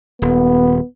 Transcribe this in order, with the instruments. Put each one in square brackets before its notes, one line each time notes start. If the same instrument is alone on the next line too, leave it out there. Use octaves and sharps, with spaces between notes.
[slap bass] D#1 [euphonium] B3